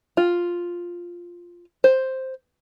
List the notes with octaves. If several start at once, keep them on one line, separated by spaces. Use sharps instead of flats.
F4
C5